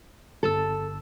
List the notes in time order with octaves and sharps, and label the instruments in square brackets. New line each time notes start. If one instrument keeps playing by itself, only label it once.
[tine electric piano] G1 A5 E6 [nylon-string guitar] A4